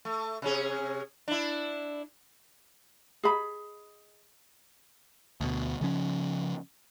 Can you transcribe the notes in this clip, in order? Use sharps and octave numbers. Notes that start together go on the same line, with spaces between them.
A3
C3 C#4 G#4
D4 E4
G#4 D#5 B5
D2 B2
C#3 F3 C#4